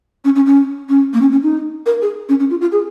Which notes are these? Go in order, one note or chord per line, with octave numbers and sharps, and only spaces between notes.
C#4
C#4
C#4
C#4
A#3
C#4
C#4
D#4
A#4
G#4
C#4
C#4
F4
F4
G#4